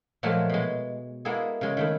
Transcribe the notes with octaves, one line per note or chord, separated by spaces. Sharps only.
A#2 F3 F#3 G#3 A3
B2 G#3
G#3 A#3 B3 E4 G#4 A4
C#3 G#3
D#3 A3 E4